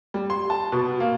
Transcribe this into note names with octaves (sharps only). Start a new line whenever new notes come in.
G3
C6
A5
B2
A#3